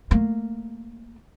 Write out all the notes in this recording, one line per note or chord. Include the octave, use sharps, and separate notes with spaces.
A3 A#3